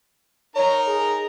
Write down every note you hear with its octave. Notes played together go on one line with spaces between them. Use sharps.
D#4 A#4 C#5 A#5
G#4